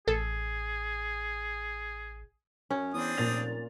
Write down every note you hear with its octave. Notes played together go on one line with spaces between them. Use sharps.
A1 G#4 A4
F#2 C#4
E2 C4 D4 D#6
F1 A#2 A6 F7